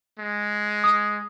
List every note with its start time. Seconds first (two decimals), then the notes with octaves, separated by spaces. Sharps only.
0.19 G#3
0.84 D#6